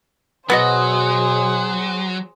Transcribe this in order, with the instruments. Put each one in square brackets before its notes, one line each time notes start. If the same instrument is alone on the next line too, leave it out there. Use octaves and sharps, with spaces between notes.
[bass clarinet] B2 [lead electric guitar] F#3 [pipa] B3 F#4 D#5 [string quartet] G#4 C5